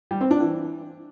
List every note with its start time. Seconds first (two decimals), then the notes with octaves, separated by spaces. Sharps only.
0.11 G3
0.21 C4
0.31 D4
0.41 E3